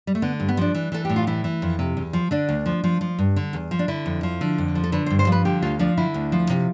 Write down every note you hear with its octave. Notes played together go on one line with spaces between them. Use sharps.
G3
A3
D3 B3
G2
B3
F3 D4
E3
E3 A4
A2 G4
F4
E3 E4
E3
F2
C3
E2
F3
D3 D4
D2
F3
F3
F3
G2
D3
E2
F3
D4
D3 E4
F2
F3
D3
F2
F3
A4
D3 B4
C5
G2
C5
F3 B4
D3 G4
D2 F4
F3 D4
D3 E4
D2
F3
C3